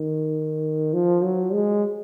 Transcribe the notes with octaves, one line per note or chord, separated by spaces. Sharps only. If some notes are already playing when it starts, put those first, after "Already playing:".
Already playing: D#3
F3
F#3
G#3